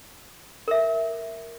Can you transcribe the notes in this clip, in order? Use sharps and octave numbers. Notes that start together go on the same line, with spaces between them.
A#4 E5